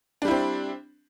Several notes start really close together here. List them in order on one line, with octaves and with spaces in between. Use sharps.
D4 G3 E4 C4